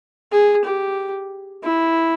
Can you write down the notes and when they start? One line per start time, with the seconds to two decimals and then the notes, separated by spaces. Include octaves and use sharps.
0.32 G#4
0.65 G4
1.64 E4